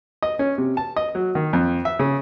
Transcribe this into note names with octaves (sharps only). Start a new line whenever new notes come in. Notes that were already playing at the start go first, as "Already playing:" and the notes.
D#5
C#4
C3
A5
D#5
F#3
D#3
F2
E5
C#3